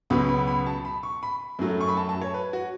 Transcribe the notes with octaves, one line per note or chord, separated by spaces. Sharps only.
C#2 B2 F#3 B3 B5
B5
B5
A5
B5
C#6
B5
F#2 F#3 A3
C#6
B5
A5
A5
C#5
B4
F#4